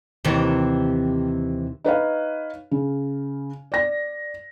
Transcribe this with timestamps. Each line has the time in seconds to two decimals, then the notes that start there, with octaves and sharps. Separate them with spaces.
0.25 D#2 C3 E3
1.84 D#4 B4 C#5 F5
2.71 C#3
3.72 D5 A#6